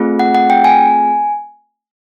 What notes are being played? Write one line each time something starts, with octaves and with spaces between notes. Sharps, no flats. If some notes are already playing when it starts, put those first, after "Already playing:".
Already playing: A3 C4 F4 G#4
F#5
F#5
G5
G#5